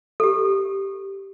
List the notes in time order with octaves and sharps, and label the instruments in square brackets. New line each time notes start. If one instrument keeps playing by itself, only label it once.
[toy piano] G4 A4